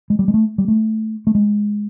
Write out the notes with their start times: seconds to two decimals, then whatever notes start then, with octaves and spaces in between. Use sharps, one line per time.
0.10 G#3
0.19 G3
0.28 G#3
0.34 A3
0.58 G3
0.68 A3
1.27 A3
1.35 G#3